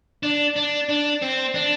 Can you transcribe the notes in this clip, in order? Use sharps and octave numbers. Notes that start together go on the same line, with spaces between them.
D4
D4
D4
C4
D4